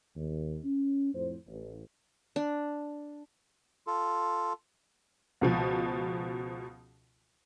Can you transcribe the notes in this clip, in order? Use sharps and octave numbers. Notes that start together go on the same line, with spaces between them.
D#2
C#4
F2 A2 C5
A1
D4
F4 A4
C#2 B2 F3